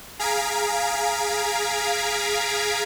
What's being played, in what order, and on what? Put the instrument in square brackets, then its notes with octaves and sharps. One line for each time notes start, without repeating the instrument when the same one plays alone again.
[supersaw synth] G#4 F5 A#5 G#6 B6 D7